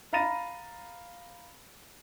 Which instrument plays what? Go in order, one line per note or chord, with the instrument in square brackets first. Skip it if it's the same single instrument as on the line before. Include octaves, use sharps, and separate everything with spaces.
[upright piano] F5 A#5 B5 A6 A#6 D#7